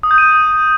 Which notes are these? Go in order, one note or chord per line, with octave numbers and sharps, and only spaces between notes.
D#6
G6
D#7